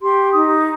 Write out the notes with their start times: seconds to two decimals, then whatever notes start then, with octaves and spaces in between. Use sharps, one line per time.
0.02 G4 C6
0.33 D#4 D#6